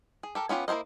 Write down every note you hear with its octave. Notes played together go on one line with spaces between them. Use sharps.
G#4
G4 A4 A#4
B3 C#4 F4 G4
A#3 E4 G#4 C5 D#5